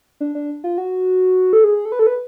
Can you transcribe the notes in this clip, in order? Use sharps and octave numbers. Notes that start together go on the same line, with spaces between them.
D4
D4
F4
F#4
A4
G#4
A4
B4
A4
B4